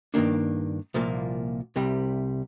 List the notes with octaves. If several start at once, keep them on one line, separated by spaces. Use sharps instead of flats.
G2 D#3 A#3 D4
C2 A#2 F3 A#3
C2 C3 G3